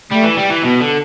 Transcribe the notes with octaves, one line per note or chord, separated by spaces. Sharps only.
G3 A3
E3
G3
E3
B2 B3
D3